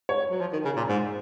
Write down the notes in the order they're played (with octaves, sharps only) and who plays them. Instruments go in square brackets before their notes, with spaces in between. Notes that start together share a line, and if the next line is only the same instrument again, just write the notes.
[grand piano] C#5
[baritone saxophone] F#3
F3
D#3
C#3
A#2
G#2